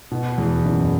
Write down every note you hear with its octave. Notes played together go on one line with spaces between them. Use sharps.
B2
E2
F#1